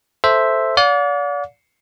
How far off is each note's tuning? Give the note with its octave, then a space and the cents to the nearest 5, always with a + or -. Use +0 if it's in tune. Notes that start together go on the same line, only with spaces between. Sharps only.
A4 +0 C5 +0 E5 +0
D5 -35 F5 +45